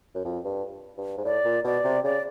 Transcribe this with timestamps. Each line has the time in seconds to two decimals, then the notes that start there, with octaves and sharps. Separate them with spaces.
0.15 F#2
0.25 F2
0.44 G2
0.98 G2
1.18 G#2
1.24 A2 D5
1.45 A#2
1.64 B2 D5
1.85 C3
2.04 C#3 D5